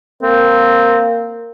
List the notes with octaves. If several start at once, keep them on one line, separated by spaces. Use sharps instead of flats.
A#3 C4